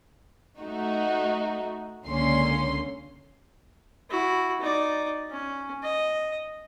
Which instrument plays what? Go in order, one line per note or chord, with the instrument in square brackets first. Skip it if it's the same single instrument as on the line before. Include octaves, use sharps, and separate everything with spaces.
[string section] A3 D#4 F#4
C#2 D3 A#3 C#4 C6
[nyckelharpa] E4 F#4
D#4 D5
C#4
D#5